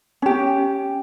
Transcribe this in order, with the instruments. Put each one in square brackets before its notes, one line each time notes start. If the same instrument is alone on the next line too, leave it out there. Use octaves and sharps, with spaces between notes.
[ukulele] C#4 G4